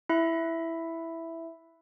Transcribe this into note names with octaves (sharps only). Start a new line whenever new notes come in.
E4 E5